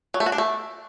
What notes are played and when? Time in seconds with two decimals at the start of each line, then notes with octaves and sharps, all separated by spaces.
0.14 F#3
0.20 A3
0.26 F#4
0.32 D4
0.38 A3